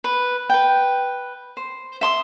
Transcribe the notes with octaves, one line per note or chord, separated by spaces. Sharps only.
B4
B4 G5
C5
E5 C6 D#6